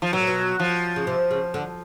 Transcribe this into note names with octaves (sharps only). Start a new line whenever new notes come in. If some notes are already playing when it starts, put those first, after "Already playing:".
F3
B2 F#3
A#2
B2
F3
C#3
C3
C#3
D3